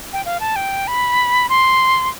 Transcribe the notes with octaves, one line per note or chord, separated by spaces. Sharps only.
G5
F5
A5
G5
B5
C6